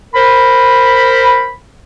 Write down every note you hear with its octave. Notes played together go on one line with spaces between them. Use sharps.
A#4 C5 B5